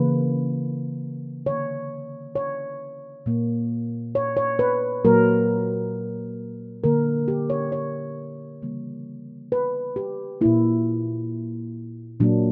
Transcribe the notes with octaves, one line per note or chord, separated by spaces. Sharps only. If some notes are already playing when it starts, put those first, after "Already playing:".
Already playing: C#3 E3 A#3 B4
D3 A#3 C#5
C#5
A#2 A#3
C#5
C#5
B4
A#2 F#3 A#3 A#4
D3 A#3 A#4
G4
C#5
C#5
C#3 E3 G3 A#3
B4
G4
A#2 A#3 E4
A#2 F#3 A#3 D4